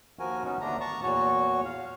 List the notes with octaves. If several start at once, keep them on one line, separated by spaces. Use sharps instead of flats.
D#2 F3 F#4 A#4 G#5
B3 C#4 D#4 F#4
D#2 D3 A3 B3 D4 A#5
A5 A#5 C#6
E2 A#2 F#4 C#5
F5